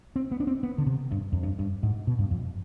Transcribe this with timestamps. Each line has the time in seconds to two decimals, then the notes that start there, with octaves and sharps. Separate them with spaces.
0.16 C4
0.31 B3
0.40 D4
0.47 C4
0.63 B3
0.78 D3
0.86 C3
1.12 G2
1.32 F2
1.43 G2
1.59 G2
1.83 G#2
2.07 B2
2.19 G2
2.31 F2